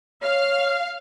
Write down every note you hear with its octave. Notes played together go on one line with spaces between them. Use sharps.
C#5 F5